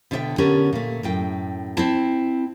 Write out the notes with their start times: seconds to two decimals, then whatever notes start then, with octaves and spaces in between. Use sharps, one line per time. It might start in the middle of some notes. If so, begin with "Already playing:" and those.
0.11 B2 D3 D4 C#5 E5 G5
0.38 D3 B3 C#4 D4 G4 A#4
0.73 A#2 A3
1.03 F#2 A2 G5
1.77 C4 E4 A5